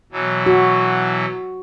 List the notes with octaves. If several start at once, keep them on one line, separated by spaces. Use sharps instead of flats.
B2 E3 F#3
F#4